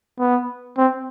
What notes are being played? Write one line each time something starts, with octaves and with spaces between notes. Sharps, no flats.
B3
C4